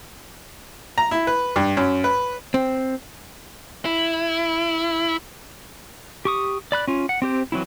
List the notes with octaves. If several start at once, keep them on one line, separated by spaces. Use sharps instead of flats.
A#5
E4
B4
G2
F#2
B4
C4
E4
G4 C#6 D#6
D5 B5 F#6
C#4 F4
F#5
C4 G4 C5
E3 F#3 C4 E4